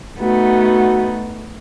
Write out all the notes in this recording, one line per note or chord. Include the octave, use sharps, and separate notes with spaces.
A3 B3 D#4 F#4